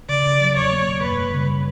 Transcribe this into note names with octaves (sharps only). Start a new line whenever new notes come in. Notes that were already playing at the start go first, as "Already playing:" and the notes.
C#3 D5
C#3
F#3
E2 C#5
A#3
B2
F#2 B4
G3
C#3